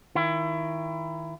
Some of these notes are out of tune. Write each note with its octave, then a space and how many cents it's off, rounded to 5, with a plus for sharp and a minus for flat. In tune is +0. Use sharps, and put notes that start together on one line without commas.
D#3 +25 E4 +30